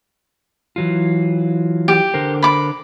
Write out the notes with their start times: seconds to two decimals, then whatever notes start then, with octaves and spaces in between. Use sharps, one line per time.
0.76 E3 F#3 F4
1.88 G4
2.14 D3 A#4 C5
2.42 B5 D6